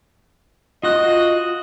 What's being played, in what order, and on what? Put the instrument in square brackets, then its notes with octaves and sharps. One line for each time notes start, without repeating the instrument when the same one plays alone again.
[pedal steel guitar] F4 F#4 F#6 [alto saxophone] D#5